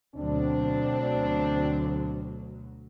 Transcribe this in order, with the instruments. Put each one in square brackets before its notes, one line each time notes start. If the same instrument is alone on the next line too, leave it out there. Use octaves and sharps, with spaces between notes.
[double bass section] D2 B2 F#3 [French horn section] C4 D4